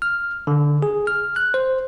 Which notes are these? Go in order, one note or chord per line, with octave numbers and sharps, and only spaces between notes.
F6
D3
G#4
F6
F#6
C5